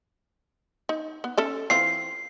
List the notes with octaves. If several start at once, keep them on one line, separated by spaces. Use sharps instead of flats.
D#4
B3
C#4 A4 E5
E3 C4 F4 C7